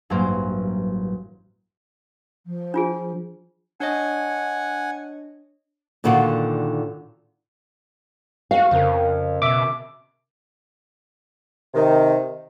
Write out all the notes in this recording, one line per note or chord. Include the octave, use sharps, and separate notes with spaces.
A1 G2 F#3 A#3 C5
F3
D4 F4 G#4
D4 C#5 D#5 F#5 G#5
A#2 D3 D#3 F4 F#4
F#4 F5
F2 C#3 C4 A#4
B2 E5 D6
C3 D#3